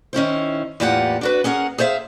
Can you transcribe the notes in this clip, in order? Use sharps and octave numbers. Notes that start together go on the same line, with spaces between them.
D#3 C#4 E4 C5
E2 A2 A#3 F4 G4 F#5
D4 F#4 B4
C#4 G#4 A#4 F#5
G#4 C5 C#5 E5 F5